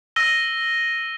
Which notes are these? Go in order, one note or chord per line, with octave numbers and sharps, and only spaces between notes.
E6 A#6 D#7 G7